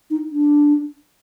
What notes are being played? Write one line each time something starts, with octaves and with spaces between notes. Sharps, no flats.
D#4
D4